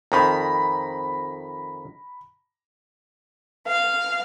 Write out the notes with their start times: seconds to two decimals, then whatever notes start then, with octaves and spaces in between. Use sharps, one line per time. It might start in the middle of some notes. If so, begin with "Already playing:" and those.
0.12 F2 D#3 A#5 B5
3.67 F5